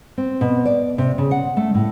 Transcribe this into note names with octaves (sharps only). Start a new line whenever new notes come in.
C4
B2
D5
C3
C#3
F#5
A3
A2